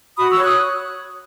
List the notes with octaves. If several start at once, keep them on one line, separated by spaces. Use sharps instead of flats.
F#4 B5 D#6
C#6 E6
C#5
D#6 F#6